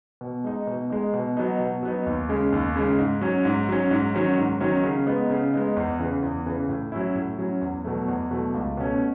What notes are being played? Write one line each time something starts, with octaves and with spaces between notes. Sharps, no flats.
B2
G#3 D#4
B2
G#3 D#4
B2
F#3 B3 D#4
B2
F#3 B3 D#4
D#2
C#3 G#3
D#2
C#3 G#3
G#2
F#3 C#4
G#2
F#3 C#4
G#2
D#3 F#3 C#4
G#2
D#3 F#3 C#4
C#3
G#3 B3 D#4
C#3
G#3 B3 D#4
E2
C#3 E3
E2
C#3 E3
A2
F#3 C#4 E4
A2
F#3 C#4 E4
E2
B2 F#3 A3
E2
B2 F#3 A3
C#2
B2 A3 C#4